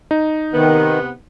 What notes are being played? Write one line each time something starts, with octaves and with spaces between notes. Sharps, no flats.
D#4
C3 D#3 B3